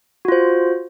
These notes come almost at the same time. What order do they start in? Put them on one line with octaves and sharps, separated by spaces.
F#4 F4 C5